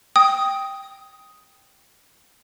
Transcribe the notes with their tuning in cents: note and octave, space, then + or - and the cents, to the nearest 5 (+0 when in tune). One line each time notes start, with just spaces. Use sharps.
G5 +0 D#6 +10